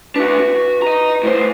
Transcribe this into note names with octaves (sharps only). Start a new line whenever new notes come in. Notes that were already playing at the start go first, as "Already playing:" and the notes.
D4 F#4 B4
F#4
D#5 A#5
A2 C5